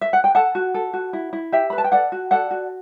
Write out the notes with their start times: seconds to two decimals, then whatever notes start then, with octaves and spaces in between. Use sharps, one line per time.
0.01 E5
0.13 F#5
0.24 G5
0.35 A4 F#5 A5
0.55 F#4
0.74 A4
0.93 F#4
1.13 E4
1.33 E4
1.52 G4 E5 G5
1.70 B4 B5
1.78 A5
1.84 G5
1.92 A4 D5 F#5
2.12 F#4
2.31 A4 D5 F#5
2.51 F#4